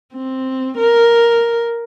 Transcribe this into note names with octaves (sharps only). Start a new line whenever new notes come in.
C4
A#4